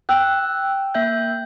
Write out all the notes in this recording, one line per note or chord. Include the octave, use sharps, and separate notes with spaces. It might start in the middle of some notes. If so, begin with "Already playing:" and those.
G5 E6 F#6
A#3 E5 G6